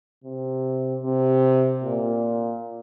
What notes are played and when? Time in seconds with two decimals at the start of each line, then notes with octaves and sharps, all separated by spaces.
0.24 C3
1.03 C3
1.84 A#2